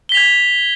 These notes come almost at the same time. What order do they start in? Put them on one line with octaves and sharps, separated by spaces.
G7 B6 F7 G#6